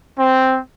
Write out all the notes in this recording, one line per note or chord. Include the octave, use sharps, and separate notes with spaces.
C4